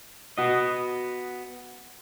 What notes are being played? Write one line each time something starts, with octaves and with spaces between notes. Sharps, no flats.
B3 F#4 D#5